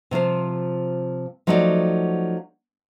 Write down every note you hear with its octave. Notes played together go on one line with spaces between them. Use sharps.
C3 F3 F4 C5
F3 F#3 A3 D#4 F#4 D5